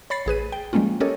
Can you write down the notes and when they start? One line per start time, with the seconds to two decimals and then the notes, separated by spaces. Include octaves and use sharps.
0.10 C#5 B5 A6 C7
0.26 A1 G#4 B4 D#7
0.52 G5
0.73 F3 G3 G#3 A#3 C#4 F4
1.00 C#4 G4 A4 A#4 C#5 D#5